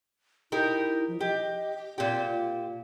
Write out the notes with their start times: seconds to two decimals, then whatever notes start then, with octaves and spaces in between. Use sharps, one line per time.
0.52 D#4 E4 G4 A#4
1.08 F3
1.20 G4 D#5
1.98 A#2 C4 G4
2.28 F4